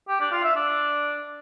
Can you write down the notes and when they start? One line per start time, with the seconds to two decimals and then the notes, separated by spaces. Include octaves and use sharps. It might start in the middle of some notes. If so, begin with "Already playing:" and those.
0.08 G4
0.20 D4
0.32 F4
0.43 E5
0.55 D4